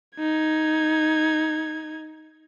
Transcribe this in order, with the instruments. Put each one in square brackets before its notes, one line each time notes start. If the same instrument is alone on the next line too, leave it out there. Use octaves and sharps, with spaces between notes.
[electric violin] D#4 G#6